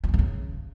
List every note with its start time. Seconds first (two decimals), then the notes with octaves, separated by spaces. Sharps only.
0.04 E3
0.09 D3
0.14 D#3
0.19 C#3